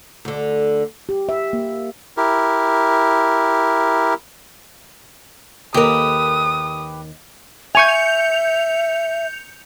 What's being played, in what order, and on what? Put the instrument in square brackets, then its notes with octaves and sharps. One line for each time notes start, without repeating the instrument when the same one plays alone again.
[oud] D2 D3
[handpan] G4
E5
A#3
[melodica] E4 G4 A#4
[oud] D#2 A#4 [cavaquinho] G4 B4 [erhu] D#6
[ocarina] E5 [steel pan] G#5 C#6 [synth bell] G6 C#7 F7